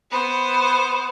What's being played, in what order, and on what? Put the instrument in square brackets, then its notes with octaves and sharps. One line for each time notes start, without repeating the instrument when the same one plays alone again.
[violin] B3 C5